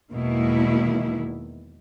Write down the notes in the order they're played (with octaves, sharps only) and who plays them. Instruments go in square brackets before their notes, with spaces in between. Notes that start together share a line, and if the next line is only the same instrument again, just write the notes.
[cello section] E2 B2 D#3 G#3 A#3 E4